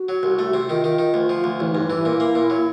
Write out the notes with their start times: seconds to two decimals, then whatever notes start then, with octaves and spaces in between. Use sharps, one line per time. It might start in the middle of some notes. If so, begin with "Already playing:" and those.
Already playing: F#4
0.09 F#3
0.23 C2
0.39 A3
0.54 C3
0.69 D#3 F4
0.84 D#3
0.99 D#3
1.14 D2
1.29 F3
1.44 D2
1.60 A1 E4
1.72 G2 D#4
1.83 E4
1.90 E3
2.05 A#2
2.20 A#3
2.35 A#2
2.50 F#3